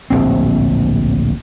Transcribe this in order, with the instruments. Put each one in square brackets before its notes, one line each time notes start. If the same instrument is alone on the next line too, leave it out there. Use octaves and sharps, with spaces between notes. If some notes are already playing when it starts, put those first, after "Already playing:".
[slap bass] D1 A#1 C4